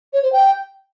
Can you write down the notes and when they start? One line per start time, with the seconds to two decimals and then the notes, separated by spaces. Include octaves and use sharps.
0.13 C#5
0.23 C5
0.32 G5